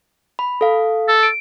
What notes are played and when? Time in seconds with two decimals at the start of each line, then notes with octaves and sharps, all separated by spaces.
0.39 B5
0.61 A4 F5
1.08 A4
1.23 D7